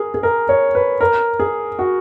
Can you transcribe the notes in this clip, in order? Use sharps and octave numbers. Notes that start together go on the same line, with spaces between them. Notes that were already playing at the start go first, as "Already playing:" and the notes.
Already playing: G#4 A#4
G#4
A#4
C#5
B4
A#4
G#4
F#4